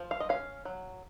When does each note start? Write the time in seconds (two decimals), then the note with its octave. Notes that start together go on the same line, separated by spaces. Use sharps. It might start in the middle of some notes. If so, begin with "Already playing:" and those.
Already playing: F3
0.11 F5
0.20 D#5
0.29 C#4 F5
0.65 F#3